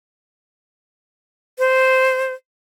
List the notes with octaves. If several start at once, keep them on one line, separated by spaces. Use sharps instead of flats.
C5